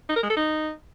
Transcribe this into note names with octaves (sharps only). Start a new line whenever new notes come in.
D#4
A#4
G#3
A4
D#4